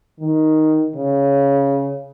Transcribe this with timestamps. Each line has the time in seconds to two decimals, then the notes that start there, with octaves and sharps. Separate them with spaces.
0.20 D#3
0.95 C#3